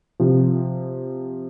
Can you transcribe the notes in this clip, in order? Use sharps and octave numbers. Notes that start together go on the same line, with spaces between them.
C3 F3